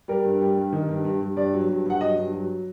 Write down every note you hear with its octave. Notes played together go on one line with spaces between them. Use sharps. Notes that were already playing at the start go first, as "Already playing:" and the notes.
G3 A#4
G2
G3
G2
D#3
G2
G2
G2
G2 D5
F#3
G2
G2 F#5
F#3 D#5
G2
F#3